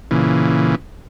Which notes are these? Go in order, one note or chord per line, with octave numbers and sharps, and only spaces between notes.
A#2 C#3 E3